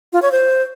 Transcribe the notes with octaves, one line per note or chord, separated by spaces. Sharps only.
F4
C#5
C5